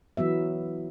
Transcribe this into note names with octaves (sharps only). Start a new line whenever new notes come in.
E3 F#3 B3 E5